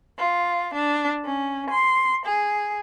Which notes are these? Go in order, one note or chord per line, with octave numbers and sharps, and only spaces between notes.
F4
D4
C#4
C6
G#4